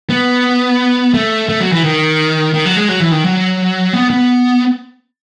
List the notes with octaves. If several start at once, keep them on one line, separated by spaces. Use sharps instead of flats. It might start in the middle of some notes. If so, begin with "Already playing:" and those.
B3
A3
A3
F#3
E3
D#3
D#3
F#3
G#3
F#3
E3
D#3
F#3
B3
B3